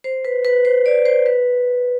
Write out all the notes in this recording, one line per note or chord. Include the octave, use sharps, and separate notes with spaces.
C5
B4
B4
C5
D5
C5
B4